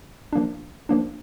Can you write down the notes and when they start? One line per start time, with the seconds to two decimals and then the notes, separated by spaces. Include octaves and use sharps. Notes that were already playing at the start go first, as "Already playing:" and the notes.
0.33 F3 A#3 D4
0.89 F3 A#3 D4